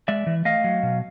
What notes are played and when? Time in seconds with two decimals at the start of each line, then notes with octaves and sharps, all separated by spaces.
0.08 G#3 D5 E5
0.27 E3
0.45 A3 D#5 F5
0.64 F#3
0.83 B2